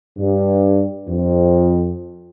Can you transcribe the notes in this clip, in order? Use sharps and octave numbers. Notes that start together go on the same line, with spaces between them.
G2
F2